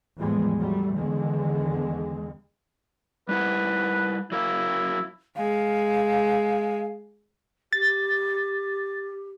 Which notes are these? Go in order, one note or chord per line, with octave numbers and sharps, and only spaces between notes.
E2 A2 F3 G3 G#3
F#3 G3 A3
E2 D3 D#3 G#3
G3 E4 B4 F#5
F#3 E4 A#4 F5
G#3 F5
G4 A6